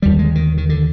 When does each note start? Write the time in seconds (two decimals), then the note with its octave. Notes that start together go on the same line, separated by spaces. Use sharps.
0.02 D#2 D3 G3
0.19 G#3
0.35 D#3
0.57 D#3
0.69 D3